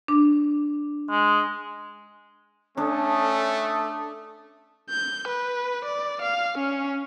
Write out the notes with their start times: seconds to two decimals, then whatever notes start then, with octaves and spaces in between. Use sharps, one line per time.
0.08 D4
1.10 G#3
2.77 A3 C#4 D4 A4 D#6
4.90 G6
5.28 B4
5.85 D5
6.22 F5
6.58 C#4